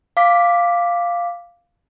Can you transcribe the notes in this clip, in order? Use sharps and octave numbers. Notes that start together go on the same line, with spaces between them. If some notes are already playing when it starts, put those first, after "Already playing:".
F5 D6 B6